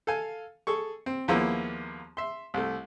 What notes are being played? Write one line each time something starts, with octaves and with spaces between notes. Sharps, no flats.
A4 F5 G#5
G#4 A4 C#6
C4
D#2 F3 G#3 A#3 B3 E4
E5 C6
C2 A3